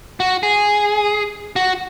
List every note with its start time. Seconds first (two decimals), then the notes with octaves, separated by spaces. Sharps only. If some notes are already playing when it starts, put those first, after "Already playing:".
0.20 F#4
0.43 G#4
1.56 F#4